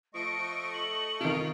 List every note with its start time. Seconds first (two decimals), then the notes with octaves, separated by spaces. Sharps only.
0.14 F3 A3 D#5 C#6 D7
0.74 F#7
1.21 C3 D#3 F4 D7